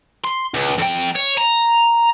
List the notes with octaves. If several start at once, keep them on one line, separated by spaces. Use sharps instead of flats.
C6
C#2
F2 G5
C#5
A#5